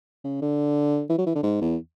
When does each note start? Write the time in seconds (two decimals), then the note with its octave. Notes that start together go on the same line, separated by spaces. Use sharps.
0.24 C#3
0.42 D3
1.10 E3
1.18 F#3
1.26 E3
1.35 D3
1.43 G#2
1.61 E2